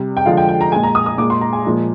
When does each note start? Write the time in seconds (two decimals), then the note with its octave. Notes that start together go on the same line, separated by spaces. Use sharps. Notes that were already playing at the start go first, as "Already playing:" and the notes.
Already playing: C3 G3
0.17 G5
0.26 D3 F3 G#3 F5
0.37 G5
0.49 G5
0.61 A#5
0.72 G#3 G#5
0.76 A#2
0.83 A#5
0.95 D#6
1.06 D#6
1.18 A#2 G#3 D6
1.30 C6
1.41 A#5
1.53 G#5
1.64 A#2 F3 G#3